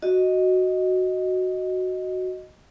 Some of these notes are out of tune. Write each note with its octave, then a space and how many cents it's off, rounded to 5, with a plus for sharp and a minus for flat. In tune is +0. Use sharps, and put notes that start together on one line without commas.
F#4 +0 D#5 +0